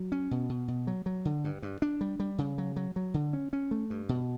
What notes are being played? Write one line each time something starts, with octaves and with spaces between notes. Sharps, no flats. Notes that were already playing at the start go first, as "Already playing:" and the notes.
Already playing: F#3
C#4
B2
B2
B2
F#3
F#3
D3
G2
G2
D4
G3
G3
C#3
F#3
F#3
F#3
D3
C#4
C#4
A3
G2
B2